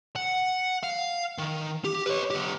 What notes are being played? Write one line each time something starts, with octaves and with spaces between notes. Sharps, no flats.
F#5
F5
D#3
G4
B4 C#5
B3 G4